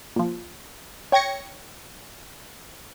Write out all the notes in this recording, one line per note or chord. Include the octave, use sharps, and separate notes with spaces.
A#2 F3
C#5 G5 G#6 A#6 C#7